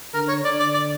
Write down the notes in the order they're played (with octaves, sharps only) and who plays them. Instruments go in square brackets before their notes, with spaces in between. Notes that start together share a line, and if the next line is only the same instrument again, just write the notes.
[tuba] D3 [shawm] A#4
[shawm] C#5
[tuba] D3 [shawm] D5
[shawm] D5
D5